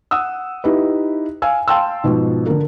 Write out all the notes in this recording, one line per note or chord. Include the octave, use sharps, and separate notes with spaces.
F#5 D#6 E6
D#4 E4 G4 B4
F5 G#5 E6
F5 G5 A5 C6 E6
G#2 B2 F3
D3 A#4